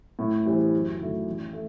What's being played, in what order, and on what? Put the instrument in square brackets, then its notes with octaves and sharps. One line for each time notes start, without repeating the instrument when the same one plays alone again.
[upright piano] A2
E3 G3 C4
F#2
D#3 F#3 A3
A1
A3